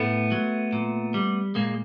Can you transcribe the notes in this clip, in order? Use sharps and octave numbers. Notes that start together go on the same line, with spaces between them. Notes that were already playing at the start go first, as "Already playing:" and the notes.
Already playing: A2 A3 B3
F#3
A#2
G3
A#2 G#3 A#3